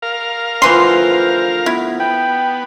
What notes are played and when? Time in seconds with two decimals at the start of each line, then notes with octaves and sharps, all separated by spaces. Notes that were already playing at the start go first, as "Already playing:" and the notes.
0.02 A#4 F5
0.62 D2 D3 E3 F3 C5 C6
1.66 B3 E4
2.00 B3 G5